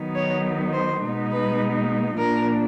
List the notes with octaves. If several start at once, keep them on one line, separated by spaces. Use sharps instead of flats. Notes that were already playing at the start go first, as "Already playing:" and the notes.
Already playing: D#3 F#3 B3 D#4
C#5
C5
B2 G#3 B3 D#4
B4
A#2 F3 A#3 D4 A#4